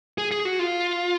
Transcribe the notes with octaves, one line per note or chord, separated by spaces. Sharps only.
G#4
G#4
F#4
F4